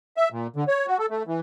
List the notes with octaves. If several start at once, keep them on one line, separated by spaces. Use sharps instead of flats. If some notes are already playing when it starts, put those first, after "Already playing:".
E5
A#2
D3
C#5
F#4
A4
A3
E3